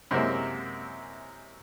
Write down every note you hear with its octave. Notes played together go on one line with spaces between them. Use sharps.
F#2 C3 G#3 A#3 C4 E4